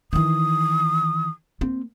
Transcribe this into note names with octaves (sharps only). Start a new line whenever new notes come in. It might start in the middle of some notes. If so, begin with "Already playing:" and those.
D#3 E3 D#6
A#3 C4